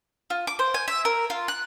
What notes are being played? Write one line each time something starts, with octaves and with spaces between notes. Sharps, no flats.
F4
D6
C5
G#5
E5
A#4
F4
F#6